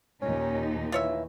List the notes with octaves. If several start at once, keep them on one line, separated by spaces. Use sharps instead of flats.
D#2 A#2 C#4 D#4
E3 F4 C#5 E5